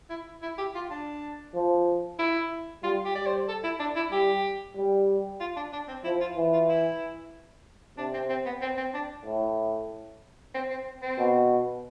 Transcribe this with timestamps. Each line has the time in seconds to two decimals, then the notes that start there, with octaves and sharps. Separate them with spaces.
0.10 E4
0.42 E4
0.58 G4
0.75 F4
0.90 D4
1.54 F3
2.19 E4
2.83 G3 F4
3.05 G4
3.15 G3 D5
3.26 C5
3.48 A4
3.64 E4
3.79 D4
3.96 E4
4.11 G3 G4
4.76 G3
5.40 F4
5.56 D4
5.73 D4
5.88 C4
6.04 F3 E4
6.21 F4
6.36 E3
6.53 F4
6.69 E4
7.97 C3 D4
8.14 C4
8.29 C4
8.46 B3
8.62 C4
8.77 C4
8.94 D4
9.26 A2
10.54 C4
10.70 C4
11.02 C4
11.18 B2